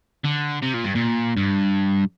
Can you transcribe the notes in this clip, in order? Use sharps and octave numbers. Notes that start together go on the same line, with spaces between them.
D3
C3
A#2
G2
A#2
G2